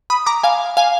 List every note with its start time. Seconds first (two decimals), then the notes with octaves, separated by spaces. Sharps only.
0.10 B5 D#6
0.26 A#5 D6
0.43 F5 G#5
0.77 F5 G#5